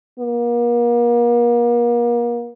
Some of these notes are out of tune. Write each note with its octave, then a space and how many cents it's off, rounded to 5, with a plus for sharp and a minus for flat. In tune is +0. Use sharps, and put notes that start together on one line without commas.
A#3 +40